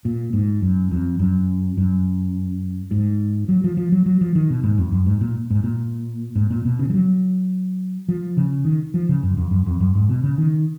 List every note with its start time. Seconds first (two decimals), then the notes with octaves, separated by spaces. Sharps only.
0.05 A#2
0.33 G#2
0.62 F#2
0.91 F2
1.19 F#2
1.77 F#2
2.91 G#2
3.49 F#3
3.64 F3
3.77 F3
3.92 F#3
4.06 F#3
4.21 F3
4.35 D#3
4.50 B2
4.64 G#2
4.78 F2
4.92 F#2
5.06 G#2
5.21 A#2
5.51 G#2
5.64 A#2
6.36 G#2
6.50 A#2
6.65 B2
6.79 C#3
6.89 F3
6.94 F#3
8.09 F3
8.37 C#3
8.65 D#3
8.94 F3
9.09 C#3
9.23 F#2
9.37 F2
9.51 F#2
9.66 F2
9.80 F#2
9.95 G#2
10.09 B2
10.24 C#3
10.38 D#3